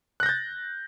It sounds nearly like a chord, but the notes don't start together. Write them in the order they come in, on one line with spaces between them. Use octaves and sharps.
F#6 A#6 G6 A6